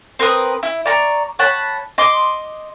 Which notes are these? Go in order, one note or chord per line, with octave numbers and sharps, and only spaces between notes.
C4 A#4 B4 D#6
E4
D5 A#5 C#6
C#5 F#5 A5 B5
D#5 C6 D6